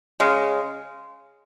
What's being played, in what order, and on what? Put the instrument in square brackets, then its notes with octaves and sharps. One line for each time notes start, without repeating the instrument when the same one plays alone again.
[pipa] C#3 G#3